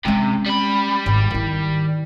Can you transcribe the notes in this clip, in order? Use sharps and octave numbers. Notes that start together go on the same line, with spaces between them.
C3 G#3 C#4
G3 B5
G#1
D#3 E4